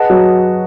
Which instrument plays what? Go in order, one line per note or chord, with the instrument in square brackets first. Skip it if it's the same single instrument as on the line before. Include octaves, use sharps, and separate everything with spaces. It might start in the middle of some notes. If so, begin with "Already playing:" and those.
Already playing: [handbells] G#4 B4 D#5 F#5 A5
[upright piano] F#3